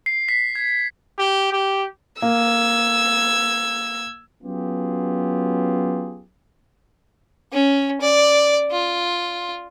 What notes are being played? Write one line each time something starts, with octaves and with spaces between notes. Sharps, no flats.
C7
B6
G#6
G4
G4
A#3 E6 G#6
F#3 B3 C#4 F4 G4 G#4
C#4
D5
F4